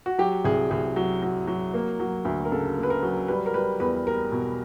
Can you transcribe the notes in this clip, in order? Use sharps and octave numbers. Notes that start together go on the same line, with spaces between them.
F#4
F#3 G4
C2 G#4
C2 G#4
F#3
F#3
F#3
A#3
F#3
D2
A#4
C#3 A4
A#3
B4
A#4
F#3
G3 B4
A#4
G3 B4
E2 B4
G3 A#4
B2